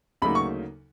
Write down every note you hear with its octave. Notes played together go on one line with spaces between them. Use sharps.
D2 C#3 F#3 A#3 D#4 B5
C#6